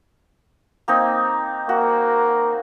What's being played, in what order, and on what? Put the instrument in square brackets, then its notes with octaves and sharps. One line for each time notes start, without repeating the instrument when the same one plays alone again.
[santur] A#3 C4 D#4
[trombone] A#3 [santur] F#4